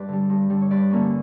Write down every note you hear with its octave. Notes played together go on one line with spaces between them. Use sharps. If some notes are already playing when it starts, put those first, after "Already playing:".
Already playing: G2 B4 D5
D3 G3
G2
D3 G3
C#5
G2 B4 D5
D3 A#3 C#4